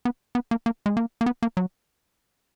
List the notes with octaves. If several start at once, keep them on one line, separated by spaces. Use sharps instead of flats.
B3
B3
A#3
A#3
G#3
A#3
A#3
B3
A#3
F#3